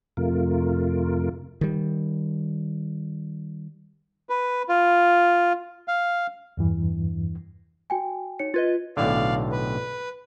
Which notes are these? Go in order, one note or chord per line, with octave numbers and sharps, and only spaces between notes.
F2 C3 A3 F4 A#4
D#3 G3
B4
F4
F5
E2 G2 E3
F#4 G5 G#5
D#4 C#5 C#7
F4 B4 D#5 G#6 A6
B1 A2 D3 D5 F5
B4